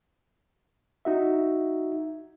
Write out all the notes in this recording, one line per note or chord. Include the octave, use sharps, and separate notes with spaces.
D#4 F#4 E5